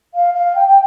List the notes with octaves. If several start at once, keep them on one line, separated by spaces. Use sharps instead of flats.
F5
F5
G5
G5